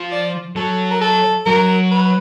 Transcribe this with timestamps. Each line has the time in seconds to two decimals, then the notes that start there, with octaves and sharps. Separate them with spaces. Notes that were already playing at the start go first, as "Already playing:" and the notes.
Already playing: F3
0.12 D5
0.56 F#3 A4
0.91 A#4
1.01 A4
1.46 F#3 A#4
1.91 B4